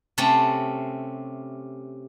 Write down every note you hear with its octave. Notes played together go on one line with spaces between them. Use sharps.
C3 A3 C4 C#4